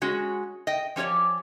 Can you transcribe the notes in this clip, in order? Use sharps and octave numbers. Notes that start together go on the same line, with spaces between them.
G#3 C#4 F#4
D#5 G5
F3 C#4 G4 C#5 D5